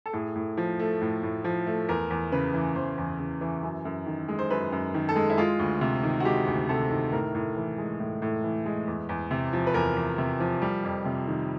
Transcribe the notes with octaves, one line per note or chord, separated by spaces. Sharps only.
A4
A2 G#4
A2
F3
A3
A2
A2
F3
A3
E2 A#4
E2
C#3 B4
E3
E2 C5
E2
C#3
E3
F#2
F#2
D#3
G#3
C5
F#2 B4
F#2
D#3
A4
G#3
E4
G#3 F4
D2
C3
D#3
F#4
G#3 G4
D2
C3 A4
D#3
A2 A#4
A2
E3
G#3
A2
A2
E3
G#3
E2
E2
C3
F3
B4
E2 A#4
E2
C3
F3
G3
F2
C3
D#3